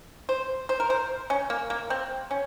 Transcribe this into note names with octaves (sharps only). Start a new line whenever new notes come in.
C5
C5
A#4
C5
C#4
A#3
A#3
C4
C#4